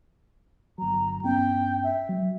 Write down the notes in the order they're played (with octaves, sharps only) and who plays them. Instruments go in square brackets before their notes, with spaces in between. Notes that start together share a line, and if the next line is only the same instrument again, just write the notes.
[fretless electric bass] G1 F#3 [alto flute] A#5
[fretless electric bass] G2 B3 C#4 [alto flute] G5
[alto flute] E5
[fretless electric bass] F#3